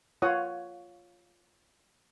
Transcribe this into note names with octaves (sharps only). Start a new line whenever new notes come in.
F4 C#5 F5 F#5 D#6